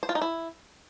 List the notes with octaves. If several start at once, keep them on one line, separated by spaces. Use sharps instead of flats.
C5
F4
D#4
E4